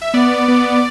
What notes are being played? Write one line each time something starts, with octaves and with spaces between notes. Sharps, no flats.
E5
B3 D5
B3